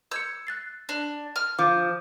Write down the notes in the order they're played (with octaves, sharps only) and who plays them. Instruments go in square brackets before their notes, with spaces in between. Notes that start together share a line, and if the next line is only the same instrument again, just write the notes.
[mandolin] E6 [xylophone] G6 G#6 C#7
[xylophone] F#6 A6 C7
[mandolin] D4
F6
[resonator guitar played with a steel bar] F3 [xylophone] D6